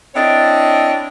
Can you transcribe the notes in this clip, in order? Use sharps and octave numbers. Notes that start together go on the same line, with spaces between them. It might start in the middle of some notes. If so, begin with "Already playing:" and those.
C4 D4 E4 C#5 D#5